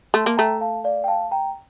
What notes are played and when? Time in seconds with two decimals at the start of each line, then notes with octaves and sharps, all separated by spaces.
0.14 A3 A5 C6
0.26 A#3
0.37 A3 G5 A#5
0.61 F5 A5
0.84 D5 F5
1.04 G5
1.08 F5 A5
1.31 G5 A#5